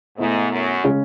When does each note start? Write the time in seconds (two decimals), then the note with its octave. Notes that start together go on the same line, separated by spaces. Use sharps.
0.18 G#2 B2 A3 E4
0.51 F#2
0.84 C#3 G#3 C#4